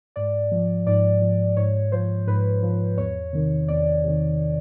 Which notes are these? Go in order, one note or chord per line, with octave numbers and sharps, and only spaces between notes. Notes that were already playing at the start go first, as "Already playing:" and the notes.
G#2 D5
F3
G#2 D5
F3
G#2 C#5
F3 C5
G#2 B4
F3
E2 C#5
C3 D#3
E2 D5
C3 D#3